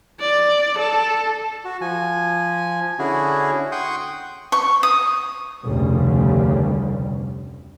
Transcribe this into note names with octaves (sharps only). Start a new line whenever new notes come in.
D5
A4
F#4
F3 G#5
D3 C#4 E4 F#4 G#4
F#5 G5 C6 C#6 D#6 G6
C#6
D#6
F1 D2 C#3 G3